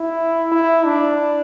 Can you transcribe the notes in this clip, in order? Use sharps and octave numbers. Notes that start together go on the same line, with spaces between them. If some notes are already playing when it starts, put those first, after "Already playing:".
Already playing: E4
E4
D4